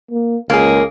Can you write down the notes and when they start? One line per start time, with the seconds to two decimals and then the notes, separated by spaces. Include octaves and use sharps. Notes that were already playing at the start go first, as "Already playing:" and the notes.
0.11 A#3
0.50 C#2 A#3 G#4